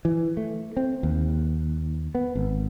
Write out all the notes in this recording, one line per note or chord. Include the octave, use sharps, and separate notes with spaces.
E3
A3
C4
D#2
B3
G#1